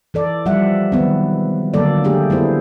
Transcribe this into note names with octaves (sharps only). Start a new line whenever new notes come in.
E3 A4 D5
F3 G3 E5 F#5
D#3 F#3 B3 C4
D3 F#3 A#3 A4 D5
A3 D4 G4 G#4
A3 B3 E4 C5